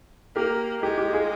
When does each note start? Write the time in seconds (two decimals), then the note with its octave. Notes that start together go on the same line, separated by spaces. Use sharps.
0.36 A#3 G4 A#4
0.83 G#3 G4
0.98 G4
1.13 F4 G#4